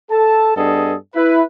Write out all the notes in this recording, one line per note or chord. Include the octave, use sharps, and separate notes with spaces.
A4 A5
G2 B3 D4 G#4 A4 D#5
E4 B4